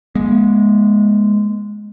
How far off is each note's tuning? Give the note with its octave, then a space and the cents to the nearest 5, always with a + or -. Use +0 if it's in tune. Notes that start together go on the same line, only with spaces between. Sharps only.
G#3 +0 B3 -45